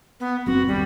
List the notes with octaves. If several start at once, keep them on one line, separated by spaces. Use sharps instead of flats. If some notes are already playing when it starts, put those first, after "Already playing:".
B3
F#1 C4 F#4
G1 D#2 G3